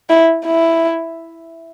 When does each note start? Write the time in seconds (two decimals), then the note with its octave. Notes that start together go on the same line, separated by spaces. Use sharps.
0.10 E4
0.45 E4